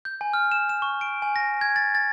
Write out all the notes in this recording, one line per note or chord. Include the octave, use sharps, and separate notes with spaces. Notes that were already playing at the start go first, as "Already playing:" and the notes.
G6
G#5
F6
E7
E7
C#6
D7
G#5
A#6
G#6
A6
A6